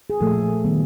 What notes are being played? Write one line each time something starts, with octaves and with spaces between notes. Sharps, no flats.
G#4
A#2 F3 A3 A4
D#3 G3 B3